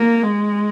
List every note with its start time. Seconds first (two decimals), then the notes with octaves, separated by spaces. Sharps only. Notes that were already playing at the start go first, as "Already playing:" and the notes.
Already playing: A#3
0.23 G#3